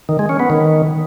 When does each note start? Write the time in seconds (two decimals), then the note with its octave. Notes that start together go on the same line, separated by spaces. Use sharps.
0.09 D#3
0.19 G#3
0.29 C#4
0.40 B3
0.50 D#3